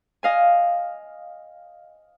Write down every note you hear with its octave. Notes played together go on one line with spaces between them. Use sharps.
D#5 F5 G#5